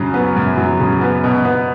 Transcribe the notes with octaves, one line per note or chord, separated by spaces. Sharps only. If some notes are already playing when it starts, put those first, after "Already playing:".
Already playing: F#2 C#3 F#3
B3
F#2
F#3
C#3
B3
B2
B3